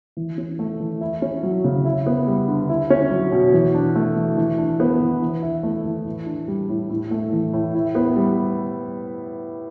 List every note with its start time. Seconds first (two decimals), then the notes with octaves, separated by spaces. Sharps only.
0.17 E3
0.38 C#4
0.59 A3
0.80 E3
1.01 E4
1.22 C#4
1.43 F#3
1.64 C#3
1.85 E4
2.06 B3
2.27 G3
2.48 D3
2.69 E4
2.90 C#4
3.11 F#3
3.32 B2
3.53 E3
3.74 D4
3.96 A3
4.16 E3
4.37 E3
4.58 D4
4.80 B3
5.00 E3
5.22 E3
5.43 E4
5.63 A3
5.85 E3
6.06 A2
6.26 D4
6.48 G3
6.69 A2
6.90 A2
7.11 A3
7.32 E3
7.53 A2
7.74 E4
7.95 B3
8.16 G3